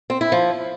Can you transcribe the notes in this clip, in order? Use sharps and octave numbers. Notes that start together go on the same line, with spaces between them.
C4
E4
F3